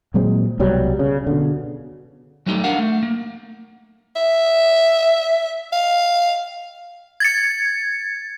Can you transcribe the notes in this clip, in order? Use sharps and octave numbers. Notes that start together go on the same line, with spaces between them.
A#2 F#3 G#3 C4
C2 B2 F#3 G3
C#3
B2 D3
F#3 G3 A3 D#4 F4 G4
D4 A#4 F5 F#5
A3
A#3
E5
F5
G#6 A6 C#7